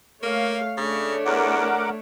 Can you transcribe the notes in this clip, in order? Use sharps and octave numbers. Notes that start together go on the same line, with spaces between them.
A3 A#3 C#5 F5
C#3 A3 D4 C#5
E2 A#4 F#5 D6